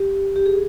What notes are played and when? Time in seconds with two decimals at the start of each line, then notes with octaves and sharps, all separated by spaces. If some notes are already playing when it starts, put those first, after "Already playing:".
Already playing: G4
0.36 G4
0.46 G#4